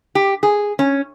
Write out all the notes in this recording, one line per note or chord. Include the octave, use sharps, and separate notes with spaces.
G4
G#4
C#4